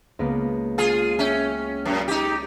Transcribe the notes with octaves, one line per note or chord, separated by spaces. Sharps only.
C#2 A#3 B3
F4 G#4
C#4 E5 G5 F6
F#2 A6 C#7 D#7
D#4 G4